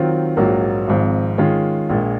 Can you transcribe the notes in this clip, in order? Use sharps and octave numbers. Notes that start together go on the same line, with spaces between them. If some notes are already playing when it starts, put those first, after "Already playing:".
Already playing: D#3 F#3 C4 F4
A#1 G#2 F#3 A#3
G#1 G#2 F3 C4
D#3 G#3 C#4 F4
A#1 A#2 G#3